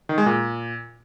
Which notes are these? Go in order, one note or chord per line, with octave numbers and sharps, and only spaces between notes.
D#3
G#3
A#2